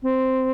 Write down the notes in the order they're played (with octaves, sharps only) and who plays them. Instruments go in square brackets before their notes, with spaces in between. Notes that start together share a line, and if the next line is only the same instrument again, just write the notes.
[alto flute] C4